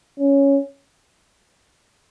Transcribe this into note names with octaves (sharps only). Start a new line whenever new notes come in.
C#4